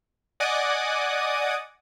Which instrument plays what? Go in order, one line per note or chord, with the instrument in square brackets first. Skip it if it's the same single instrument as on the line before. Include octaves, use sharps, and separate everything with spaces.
[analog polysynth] D5 D#5 F#5 G#5 D6 D#6